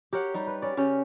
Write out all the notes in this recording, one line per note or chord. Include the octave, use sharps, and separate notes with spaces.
G4 A#4 C#5 F#5
G3 D#4
B4
C#4 D5
C#3 C#4 G4